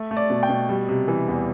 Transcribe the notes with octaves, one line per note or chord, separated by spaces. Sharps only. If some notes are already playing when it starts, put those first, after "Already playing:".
Already playing: A3
A3
D5
B2
G5
B2
G3
C3
E3
E2